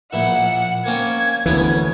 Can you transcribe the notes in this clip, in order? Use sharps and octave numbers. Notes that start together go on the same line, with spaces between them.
A#1 A#2 E4 F#5
A#3 C4 C#4 G#6
D2 E3 B3 C#4